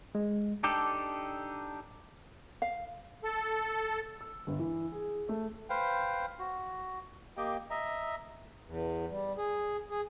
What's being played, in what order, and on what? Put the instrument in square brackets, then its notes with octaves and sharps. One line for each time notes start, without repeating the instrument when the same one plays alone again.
[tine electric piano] G#3
[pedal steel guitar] D4 D#4 G4 A4
[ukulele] F5
[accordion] A4
[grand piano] E6
G1
E3
G#4
A3
[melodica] B4 C5 F5 G5
F#4
A#3 G4 D#5 G5
D#5 E5 A#5
[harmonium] E2
G3
G#4
G#4